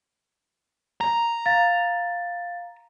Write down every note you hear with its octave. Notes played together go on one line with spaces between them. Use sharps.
A#5
F5 A6